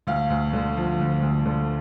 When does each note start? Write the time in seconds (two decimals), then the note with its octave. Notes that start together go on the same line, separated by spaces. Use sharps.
0.07 D2 F5
0.30 D2
0.53 D3
0.77 F3
1.00 D2
1.22 D2
1.46 D3